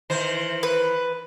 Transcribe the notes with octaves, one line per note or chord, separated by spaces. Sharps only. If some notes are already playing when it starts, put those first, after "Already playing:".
D#3 E3 C5
B4